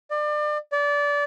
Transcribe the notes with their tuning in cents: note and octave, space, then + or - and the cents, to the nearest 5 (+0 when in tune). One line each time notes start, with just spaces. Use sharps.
D5 +30
D5 -25